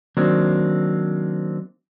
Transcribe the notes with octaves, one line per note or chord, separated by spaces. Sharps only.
D#3 F#3 A#3 C4 D4